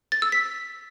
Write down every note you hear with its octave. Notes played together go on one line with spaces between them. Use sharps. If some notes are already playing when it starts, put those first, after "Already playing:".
A6
E6
B6